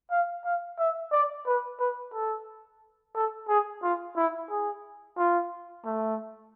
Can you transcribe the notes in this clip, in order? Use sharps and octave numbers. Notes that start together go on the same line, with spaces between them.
F5
F5
E5
D5
B4
B4
A4
A4
G#4
F4
E4
G#4
F4
A3